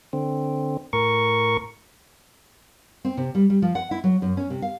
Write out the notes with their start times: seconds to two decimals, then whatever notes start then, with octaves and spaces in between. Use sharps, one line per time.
0.13 D3 C4
0.93 A2 A#4 C#6
3.05 C4
3.17 C3
3.35 G3
3.50 G3
3.62 F3
3.75 F#5
3.91 E4
4.04 F#3
4.22 F#2
4.37 C#4
4.50 C3
4.62 F5